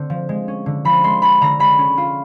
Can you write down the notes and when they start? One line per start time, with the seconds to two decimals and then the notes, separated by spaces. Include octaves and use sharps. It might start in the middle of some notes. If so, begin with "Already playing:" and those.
Already playing: D3 A3 C4
0.10 F3
0.29 G#3
0.48 C#4
0.66 D3
0.85 F3 B5
1.04 G#3 C6
1.22 C#4 B5
1.41 D3 A#5
1.59 G#3 B5
1.79 C#4
1.98 F4